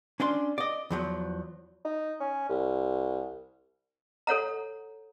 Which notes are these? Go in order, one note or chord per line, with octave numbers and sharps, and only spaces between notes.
C#4 D4 D5 C6
D5 D#5
E2 F3 F#3
D#4
C#4
C2
A4 C#5 F#5 A#5